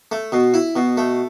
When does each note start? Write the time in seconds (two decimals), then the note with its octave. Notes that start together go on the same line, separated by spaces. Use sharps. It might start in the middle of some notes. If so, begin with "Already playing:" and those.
0.12 A3
0.32 B2
0.54 E4
0.76 B2
0.97 A3